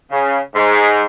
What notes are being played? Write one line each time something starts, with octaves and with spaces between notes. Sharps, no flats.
C#3
G#2